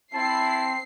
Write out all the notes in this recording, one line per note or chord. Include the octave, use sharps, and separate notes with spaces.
C4 E4 A5 C7